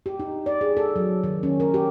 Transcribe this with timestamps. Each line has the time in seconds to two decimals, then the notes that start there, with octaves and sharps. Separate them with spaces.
0.06 G4
0.19 D#4
0.46 D5
0.61 G#4
0.77 A4
0.96 F#3
1.23 D#3
1.43 C#4
1.60 A#4
1.74 G4